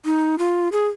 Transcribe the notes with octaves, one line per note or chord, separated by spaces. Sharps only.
D#4
F4
G#4